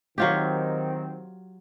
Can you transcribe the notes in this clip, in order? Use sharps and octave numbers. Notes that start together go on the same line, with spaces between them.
D#3 F#3 C4 F4 G4